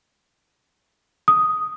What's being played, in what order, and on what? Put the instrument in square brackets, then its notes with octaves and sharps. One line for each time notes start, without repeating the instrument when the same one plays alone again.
[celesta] D#6